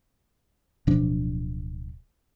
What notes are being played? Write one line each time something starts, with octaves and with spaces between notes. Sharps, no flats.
D1 B2 F3 D4